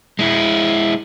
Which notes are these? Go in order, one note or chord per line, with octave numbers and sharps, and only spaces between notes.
G#3 E4